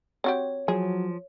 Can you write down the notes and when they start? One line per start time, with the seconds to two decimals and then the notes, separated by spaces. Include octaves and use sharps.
0.24 C4 F#4 G4 C#5
0.68 F3 F#3 G#4